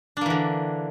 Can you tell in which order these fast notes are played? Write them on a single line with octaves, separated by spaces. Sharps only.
D4 A#3 E3 D3